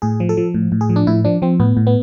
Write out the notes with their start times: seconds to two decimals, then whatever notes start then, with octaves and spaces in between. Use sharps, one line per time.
0.02 A2 G#4
0.20 F3
0.29 A4
0.37 F3
0.54 A2
0.72 A2
0.81 G#4
0.90 F3
0.96 D4
1.07 A2 E4
1.25 F3 D4
1.42 F3 C4
1.60 A2 B3
1.77 A2
1.87 B3